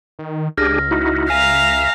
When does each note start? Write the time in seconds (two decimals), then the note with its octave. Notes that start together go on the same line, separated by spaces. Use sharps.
0.19 D#3
0.58 C#2 D4 G4 G#4 F6 A#6
0.91 D#4 E4 F#4
1.30 E5 F5 G#5 A#5